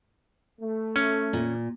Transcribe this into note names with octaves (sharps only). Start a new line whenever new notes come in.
A3
C#4
A#2